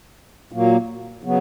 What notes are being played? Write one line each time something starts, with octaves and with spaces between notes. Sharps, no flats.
A#2 F#3 A#3
C#3 F#3 B3